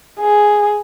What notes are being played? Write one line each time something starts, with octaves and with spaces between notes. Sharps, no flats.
G#4